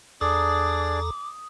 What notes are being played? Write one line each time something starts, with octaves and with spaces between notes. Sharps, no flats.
E2 D4 G#4 A4 D5 A#5 D6 D#6